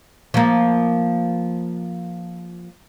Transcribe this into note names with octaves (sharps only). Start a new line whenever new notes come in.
F3 A#3